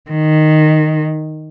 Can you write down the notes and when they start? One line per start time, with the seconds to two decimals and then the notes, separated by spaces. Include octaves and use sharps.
0.11 D#3